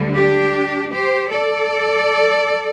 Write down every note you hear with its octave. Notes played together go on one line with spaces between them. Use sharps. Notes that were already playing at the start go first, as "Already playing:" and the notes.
Already playing: D2 D3 G3
D4 G4
G4 C5
A4 D5